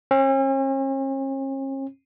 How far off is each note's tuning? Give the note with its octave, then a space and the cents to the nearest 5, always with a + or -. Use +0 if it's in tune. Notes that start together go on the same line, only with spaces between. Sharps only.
C#4 -45